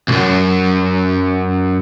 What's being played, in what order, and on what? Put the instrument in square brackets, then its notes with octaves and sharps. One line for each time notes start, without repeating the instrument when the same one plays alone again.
[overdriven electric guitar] B1 F#2